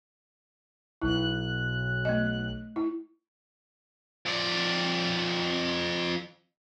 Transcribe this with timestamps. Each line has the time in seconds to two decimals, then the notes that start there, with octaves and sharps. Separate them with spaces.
1.02 B1 E4 F#6
2.05 A3 D#5
2.76 E4
4.26 F2 D5